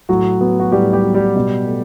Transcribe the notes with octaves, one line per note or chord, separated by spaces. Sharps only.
A2 F#3 F#4
F#3 B3
F#4
A2 G3 G4
G3 G4
F#3 B3
G3 G4
B2
A3